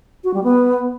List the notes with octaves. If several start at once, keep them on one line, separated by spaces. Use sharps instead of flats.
F#4
G3
B3